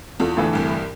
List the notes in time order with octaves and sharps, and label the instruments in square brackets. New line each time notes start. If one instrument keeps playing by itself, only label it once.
[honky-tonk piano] E2 F4 A4
[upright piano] A2 D3 E3
[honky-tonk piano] C2 G2